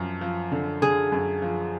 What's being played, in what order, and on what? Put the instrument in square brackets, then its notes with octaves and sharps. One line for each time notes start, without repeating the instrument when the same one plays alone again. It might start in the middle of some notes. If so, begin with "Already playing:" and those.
Already playing: [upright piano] F#2 F3
F3
D3
[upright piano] D3 [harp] G#4
[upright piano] F#2
F3